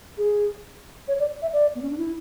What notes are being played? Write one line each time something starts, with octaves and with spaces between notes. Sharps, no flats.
G#4
C#5
D5
E5
D5
B3
C#4
D4
E4